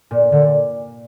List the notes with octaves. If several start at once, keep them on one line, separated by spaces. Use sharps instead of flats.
A#2
A#2 D3